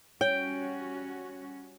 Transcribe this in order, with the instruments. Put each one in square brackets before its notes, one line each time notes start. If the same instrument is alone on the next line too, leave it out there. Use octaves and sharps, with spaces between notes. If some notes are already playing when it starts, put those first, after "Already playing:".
[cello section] G3 C#4 F#4 [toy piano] C#5 [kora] G5